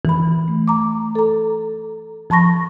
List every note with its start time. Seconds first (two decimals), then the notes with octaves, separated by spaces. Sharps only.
0.05 E3 B5
0.48 A3
0.68 A#5 D6
1.15 A4 A#5
2.30 F3 A5 B5 C#6 A#6